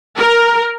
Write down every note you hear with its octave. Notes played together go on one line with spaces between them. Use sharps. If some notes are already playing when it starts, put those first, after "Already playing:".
A#4